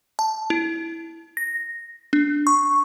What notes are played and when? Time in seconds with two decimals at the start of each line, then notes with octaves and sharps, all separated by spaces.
0.19 A5
0.50 E4
1.37 A#6
2.13 D4
2.47 C#6